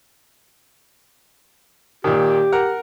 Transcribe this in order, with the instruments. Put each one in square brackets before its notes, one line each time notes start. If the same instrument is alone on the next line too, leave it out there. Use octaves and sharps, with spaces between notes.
[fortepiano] A#2 D#3 [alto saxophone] G4
[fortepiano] A#4 F#5 A#5